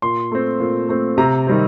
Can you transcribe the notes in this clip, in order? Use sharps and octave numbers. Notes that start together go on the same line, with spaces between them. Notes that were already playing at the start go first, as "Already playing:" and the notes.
A#2 C6
A3 C4
A#2
A3 C4
C3 A#5
D#3 G3 C4